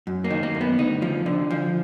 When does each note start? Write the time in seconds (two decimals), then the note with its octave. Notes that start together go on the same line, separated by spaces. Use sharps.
0.07 F#2
0.24 A#3
0.30 D#3
0.43 A#3
0.55 F#2
0.61 B3
0.78 D2 D#4
1.02 F3
1.26 D3
1.51 F3